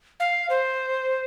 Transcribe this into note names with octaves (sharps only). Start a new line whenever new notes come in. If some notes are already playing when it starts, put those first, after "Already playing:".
F5
C5